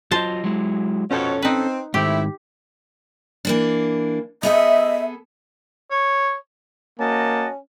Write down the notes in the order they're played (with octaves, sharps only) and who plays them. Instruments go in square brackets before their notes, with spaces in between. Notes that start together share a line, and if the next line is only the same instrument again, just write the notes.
[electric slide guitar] F#3 F4 D#5 [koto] C5 A5
[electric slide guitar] F#3 G#3 E4
[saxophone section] F2 B2 C#5 [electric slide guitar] C#4 A4
[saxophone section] C4 [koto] D#4 B4
[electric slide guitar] G#2 D#3 [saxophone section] A3 C4 E4 [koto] G4
[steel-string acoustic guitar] E3 A#3 D4
[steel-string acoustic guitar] B3 G#4 A4 [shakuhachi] D#5 [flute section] E5
[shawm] C#5
[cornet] A#3 [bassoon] C#4 [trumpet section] F#4 D#5 A5